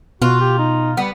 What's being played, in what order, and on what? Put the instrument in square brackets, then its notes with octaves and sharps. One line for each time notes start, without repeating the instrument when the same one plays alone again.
[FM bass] B2 [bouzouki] F4 [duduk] F#4
[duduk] G4
D#4
[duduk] G3 [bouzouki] B3